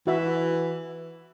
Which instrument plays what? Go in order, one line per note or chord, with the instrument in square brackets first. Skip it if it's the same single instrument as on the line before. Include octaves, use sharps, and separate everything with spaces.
[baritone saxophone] E3 [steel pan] F#4 E5